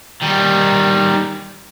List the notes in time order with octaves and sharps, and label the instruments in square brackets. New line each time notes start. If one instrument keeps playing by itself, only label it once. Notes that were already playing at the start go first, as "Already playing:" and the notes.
[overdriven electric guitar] D#3 G3